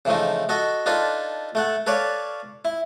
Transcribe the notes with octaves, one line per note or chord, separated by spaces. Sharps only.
C#3 E3 F3 A3 D#4
F#4 A4 D#5
D4 D#4 F4 A4 B4
A3 A4 F#5
A4 B4 C#5 D5 F5
E4